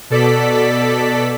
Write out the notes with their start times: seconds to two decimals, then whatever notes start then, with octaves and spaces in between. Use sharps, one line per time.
0.10 B2 A4 D5 B6